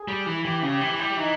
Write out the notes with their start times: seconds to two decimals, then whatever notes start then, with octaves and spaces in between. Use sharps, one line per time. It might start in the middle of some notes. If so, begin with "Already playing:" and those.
Already playing: G#4
0.08 G3
0.26 E3
0.44 E3 G4
0.62 C#3
0.68 G4
0.81 E3
0.92 E4
0.99 G3
1.17 E3 D#4